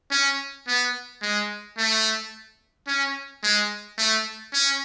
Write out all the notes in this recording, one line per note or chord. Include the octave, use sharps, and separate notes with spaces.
C#4
B3
G#3
A3
C#4
G#3
A3
C#4